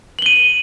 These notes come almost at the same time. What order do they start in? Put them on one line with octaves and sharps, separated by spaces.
F#7 G7 D#7